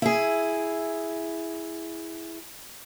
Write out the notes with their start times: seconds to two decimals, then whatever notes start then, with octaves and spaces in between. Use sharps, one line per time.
0.02 E4 G#4